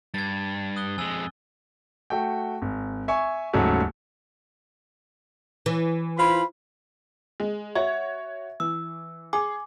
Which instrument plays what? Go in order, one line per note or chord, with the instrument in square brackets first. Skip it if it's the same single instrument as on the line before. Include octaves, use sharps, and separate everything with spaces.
[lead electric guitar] G2 [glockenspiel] G#6 A6
[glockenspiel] D#6 F#6 G7
[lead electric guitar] F2 G#3 [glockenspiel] G#5 E6
[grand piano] A3 F#4 G5
G#1
E5 G#5 C#6
D#1 G#2 C#3 F#3 A3 F#4
[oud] E3
[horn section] F4 C5 B5
[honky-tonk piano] G#3
[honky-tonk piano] F#4 C#5 G#6 [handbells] E5
[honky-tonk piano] E3 [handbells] E6
[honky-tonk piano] G#4 [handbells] G#5 D6